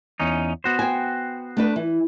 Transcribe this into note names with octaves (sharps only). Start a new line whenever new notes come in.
E2 C#4 D#4
B3 F#4 C5
G5 G#5
A3 D4 B4
E3